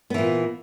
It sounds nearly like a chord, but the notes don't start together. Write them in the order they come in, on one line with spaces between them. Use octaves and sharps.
B3 E3 A#2